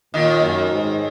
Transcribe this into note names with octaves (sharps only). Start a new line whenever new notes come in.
D#2 A#2 D#3
F#2
G#2